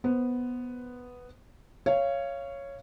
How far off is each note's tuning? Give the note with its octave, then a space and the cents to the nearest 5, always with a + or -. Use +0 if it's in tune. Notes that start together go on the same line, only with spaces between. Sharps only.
B3 +0 C5 +0
C#5 +0 F5 -25